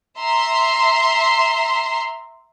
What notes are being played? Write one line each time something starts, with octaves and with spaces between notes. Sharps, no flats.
E5 A#5 C6